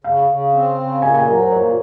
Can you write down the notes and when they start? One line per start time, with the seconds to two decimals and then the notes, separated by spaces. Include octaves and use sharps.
0.04 C#3 F5
0.29 C#3
0.53 C4
0.78 C#3
1.02 A#2 G#5
1.14 G#5
1.27 F#3 A#4
1.39 C5
1.52 A#2 C#5